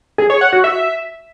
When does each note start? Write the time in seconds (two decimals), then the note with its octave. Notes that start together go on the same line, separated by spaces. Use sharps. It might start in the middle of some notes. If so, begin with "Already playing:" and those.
0.18 G#4
0.30 C#5
0.41 F#5
0.53 F#4
0.64 E5